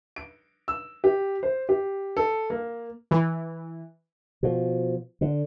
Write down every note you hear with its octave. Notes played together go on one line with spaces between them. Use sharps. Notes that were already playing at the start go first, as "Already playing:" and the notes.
D7
E6
G4
C5
G4
A4
A#3
E3
B2 F3
D3